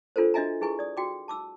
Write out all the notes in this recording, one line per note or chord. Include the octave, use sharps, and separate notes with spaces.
D4 F4 A4 A#4 C5
D4 F#4 D#5 E5 G#5 A#5
E4 G#4 B4 G#5 C#6
D5 D#6
F#4 G5 D6
A5 D6 E6